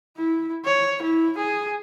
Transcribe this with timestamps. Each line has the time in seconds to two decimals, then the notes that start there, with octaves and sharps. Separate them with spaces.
0.17 E4
0.65 C#5
1.02 E4
1.38 G#4